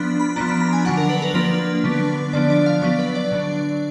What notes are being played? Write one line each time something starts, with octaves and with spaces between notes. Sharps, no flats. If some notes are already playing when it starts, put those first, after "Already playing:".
Already playing: F3 B3 D4 B5
B5
F3 B3 D4 A#5
B5
A#5
G#5
D3 F#3 D4 F#5
A#4
B4
A#4
F3 A#3 D4 B4
D3 F#3 B3 D4
D3 F3 B3 D4 D5
D5
F5
F#3 B3 D4 D5
B4
D5
D3 F#3 D4